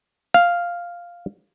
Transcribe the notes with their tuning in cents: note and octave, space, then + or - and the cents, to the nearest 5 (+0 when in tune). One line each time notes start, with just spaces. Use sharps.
F5 +0